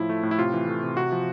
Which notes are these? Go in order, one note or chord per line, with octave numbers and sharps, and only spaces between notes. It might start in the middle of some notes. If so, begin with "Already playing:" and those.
Already playing: A2 F3 E4
A3
A2
E4
C3 F4
E3
A3
C3
C3 F#4
F3